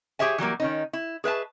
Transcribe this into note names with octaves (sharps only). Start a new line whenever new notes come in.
G4 G#4 C#5 E5 G#5
E3 F#3 G3 A#3
D#3 C#4 D#4
E4
G#4 B4 E5 A5